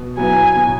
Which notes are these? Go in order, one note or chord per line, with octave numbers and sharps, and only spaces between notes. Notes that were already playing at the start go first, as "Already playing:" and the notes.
Already playing: B2
F#3 B3 E4 B4 G#5
B2